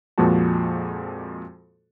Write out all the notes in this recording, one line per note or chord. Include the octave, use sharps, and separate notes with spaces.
F2 A#2 F3 G#3 F#4 A5